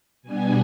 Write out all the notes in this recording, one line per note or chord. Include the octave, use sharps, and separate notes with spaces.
B2 G3 B3 D4 G#5